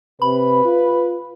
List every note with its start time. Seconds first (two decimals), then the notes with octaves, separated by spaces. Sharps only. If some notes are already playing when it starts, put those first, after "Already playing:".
0.22 C3 B4 B5
0.65 F4